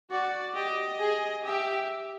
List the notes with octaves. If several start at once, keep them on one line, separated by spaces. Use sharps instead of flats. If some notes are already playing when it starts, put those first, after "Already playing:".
F#4 D5
G4 D#5
G#4
G4 E5